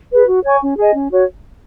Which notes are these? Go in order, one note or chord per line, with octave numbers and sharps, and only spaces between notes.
G#4 B4
F#4
C#5 G#5 C#6
C#4
G#4 D#5 G#5
C#4
F#4 C#5